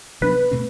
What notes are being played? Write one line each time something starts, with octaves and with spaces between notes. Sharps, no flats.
C3 F#3 B3 D4 B4
B2 A3 C4